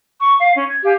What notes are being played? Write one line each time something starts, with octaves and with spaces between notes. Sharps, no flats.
C#6
F5
C#4
G#6
G4 F5 G#5